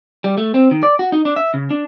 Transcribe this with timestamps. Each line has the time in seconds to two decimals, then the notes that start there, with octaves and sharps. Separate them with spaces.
0.24 G3
0.38 A3
0.54 C4
0.71 D#3
0.83 D5
0.99 F#4
1.12 D#4
1.25 D4
1.36 E5
1.54 C#3
1.70 D4